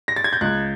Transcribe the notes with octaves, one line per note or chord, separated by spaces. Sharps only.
A#6
A6
G#6
G6
C#2 F#6